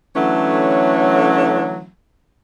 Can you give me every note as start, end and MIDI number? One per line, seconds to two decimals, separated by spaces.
0.16 1.88 50
0.16 1.88 52
0.16 1.88 54
0.16 1.88 57
0.16 1.88 61